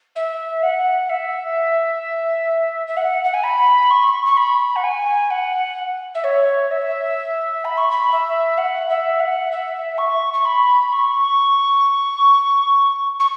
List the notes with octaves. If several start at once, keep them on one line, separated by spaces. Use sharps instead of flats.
E5
F#5
E5
E5
F#5
F#5
G#5
B5
C#6
C#6
B5
F#5
G#5
F#5
E5
C#5
E5
B5
C#6
B5
E5
F#5
E5
F#5
E5
C#6
C#6
B5
C#6
C#6